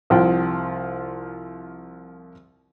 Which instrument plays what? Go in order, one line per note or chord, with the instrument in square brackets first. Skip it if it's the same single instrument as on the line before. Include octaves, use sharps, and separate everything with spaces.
[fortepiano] C2 F3 G5